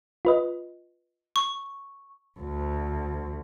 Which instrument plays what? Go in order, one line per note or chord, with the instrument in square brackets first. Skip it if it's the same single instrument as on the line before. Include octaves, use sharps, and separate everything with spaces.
[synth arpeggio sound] F4 B4 D#5
[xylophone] C#6
[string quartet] D2